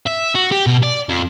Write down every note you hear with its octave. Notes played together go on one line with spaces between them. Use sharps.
E5
F#4
G4
B2
D5
F2